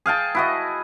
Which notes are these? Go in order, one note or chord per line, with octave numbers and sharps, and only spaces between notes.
G#4 F5 G5 A5
E4 F#4 D#5